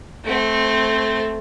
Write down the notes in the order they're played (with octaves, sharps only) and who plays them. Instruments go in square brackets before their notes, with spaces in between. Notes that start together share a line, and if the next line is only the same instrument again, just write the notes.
[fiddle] A3 C4